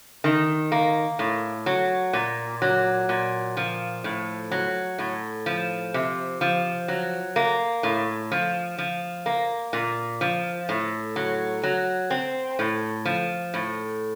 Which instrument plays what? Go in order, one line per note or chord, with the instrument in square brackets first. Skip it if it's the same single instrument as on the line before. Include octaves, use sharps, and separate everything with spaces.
[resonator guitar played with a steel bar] D#3
A#3
A2
F#3
A#2
F#3
A#2
F3
A2
F#3
A2
F3
C3
F3
F#3
A#3
A2
F3
F3
A#3
A#2
F3
A2
F#3
F#3
C4
A2
F3
A2